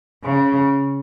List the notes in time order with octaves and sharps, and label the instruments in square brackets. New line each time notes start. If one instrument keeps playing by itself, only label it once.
[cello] C#3